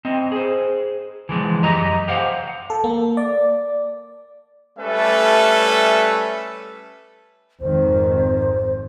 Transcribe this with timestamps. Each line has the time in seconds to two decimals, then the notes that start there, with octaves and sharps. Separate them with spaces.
0.05 C4 D#5
0.32 G#4 C5
1.29 E3 F3 G#3
1.63 F#2 G4 D#5 A#5
2.08 G4 C5 F5 F#5
2.70 A4
2.84 A#3
3.17 D5
4.79 G3 A3 C#4 A4 B4 E5
7.61 G#1 F2 D#3 C5